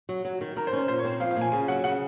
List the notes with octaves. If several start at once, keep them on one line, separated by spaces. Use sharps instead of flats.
F#3
F#3
D#3
D#3 A#4
C5
C#4
C5
A#2 C5
C#5
C4
F3 F5
F5
A#2 G#5
C#3 G#5
F#3 F#5
C#3 F#5